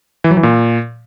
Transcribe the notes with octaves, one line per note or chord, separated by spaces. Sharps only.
E3
F#3
E3
A#2